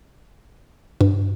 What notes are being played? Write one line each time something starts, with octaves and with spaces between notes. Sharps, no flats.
G2